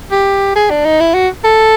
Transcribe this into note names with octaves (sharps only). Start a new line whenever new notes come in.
G4
G#4
D4
D#4
E4
F#4
A4